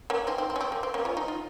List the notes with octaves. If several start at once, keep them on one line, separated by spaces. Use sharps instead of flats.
A#3 C#4
C4 D#4
C4
C4
C#4
C4
A#3
C4
A#3 C#4
C#4 F4
D#4
F4